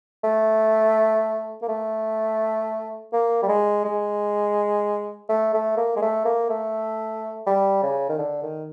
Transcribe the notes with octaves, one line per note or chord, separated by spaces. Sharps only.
A3
A#3
A3
A#3
G3
G#3
G#3
A3
A3
A#3
G#3
A3
A#3
A3
G3
C#3
D#3
D3
D#3